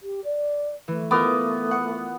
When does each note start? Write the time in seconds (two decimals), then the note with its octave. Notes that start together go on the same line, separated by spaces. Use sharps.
0.02 G4
0.24 D5
0.88 E3 A3
1.11 B3 F4 A#4 D6
1.71 F#5